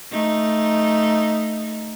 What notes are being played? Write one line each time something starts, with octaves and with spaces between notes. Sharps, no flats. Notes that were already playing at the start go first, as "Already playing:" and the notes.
A3 D#4